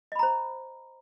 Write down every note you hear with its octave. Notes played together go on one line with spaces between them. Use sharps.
C5 D#5 A#5 B5